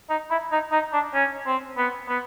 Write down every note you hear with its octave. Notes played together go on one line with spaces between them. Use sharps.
D#4
E4
D#4
D#4
D4
C#4
C4
B3
B3